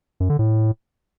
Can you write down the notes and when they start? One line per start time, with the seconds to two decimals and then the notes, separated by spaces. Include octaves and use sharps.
0.20 F#2
0.30 D3
0.39 A2